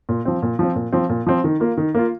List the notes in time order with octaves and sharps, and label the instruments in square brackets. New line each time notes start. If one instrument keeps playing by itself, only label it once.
[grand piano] A#2
F3 C4
A#2
F3 C4
A#2
F3 C4
A#2
F3 C4
D#3
A#3 F4
D#3
A#3 F4